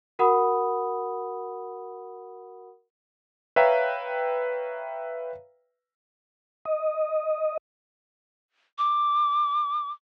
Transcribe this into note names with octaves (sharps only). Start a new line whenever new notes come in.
F#4 A#4 F#5 B5 D#6
B4 C#5 E5 F5 G5 A#5
D#5
D6